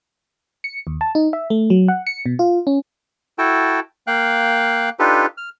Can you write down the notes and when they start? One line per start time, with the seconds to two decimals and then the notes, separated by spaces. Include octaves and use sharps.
0.64 C#7
0.87 D#2
1.01 A5
1.15 D#4
1.33 E5
1.50 A3
1.70 F#3
1.88 F#5
2.07 C#7
2.26 B2
2.39 F4
2.67 C#4
3.38 E4 F#4 A4 G5 A5
4.07 A#3 F5 G5 F#6
4.99 D4 D#4 F4 G4 A4 B4
5.37 F6